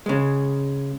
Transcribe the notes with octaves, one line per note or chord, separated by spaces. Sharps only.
C#3 G#3